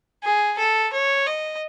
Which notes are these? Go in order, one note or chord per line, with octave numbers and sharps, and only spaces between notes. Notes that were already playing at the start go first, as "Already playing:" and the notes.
G#4
A4
C#5
D#5